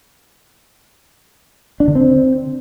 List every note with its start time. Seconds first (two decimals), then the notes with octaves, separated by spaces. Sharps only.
1.80 D4
1.88 D3
1.95 C4